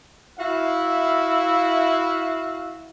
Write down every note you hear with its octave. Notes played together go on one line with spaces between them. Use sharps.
E4 F#4 E5 F5